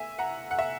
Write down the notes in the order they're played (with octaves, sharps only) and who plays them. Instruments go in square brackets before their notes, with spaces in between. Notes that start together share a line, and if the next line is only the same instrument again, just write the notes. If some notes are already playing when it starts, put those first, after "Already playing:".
Already playing: [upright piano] E5 G#5
F#5 A#5
F#5
E5